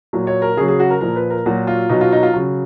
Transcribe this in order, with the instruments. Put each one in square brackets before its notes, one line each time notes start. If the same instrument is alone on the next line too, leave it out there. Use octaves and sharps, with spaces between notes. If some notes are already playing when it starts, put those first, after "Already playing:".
[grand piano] A#2 F#3
C#5
A#4
C#3 G#4
F#3
G#4
F#4
A#4
A#2 F3 A#4
B4
A#4
A#2 F#3 F#4
F4
B2 F#3 D#4
F4
D#4
F4
C#3 F#3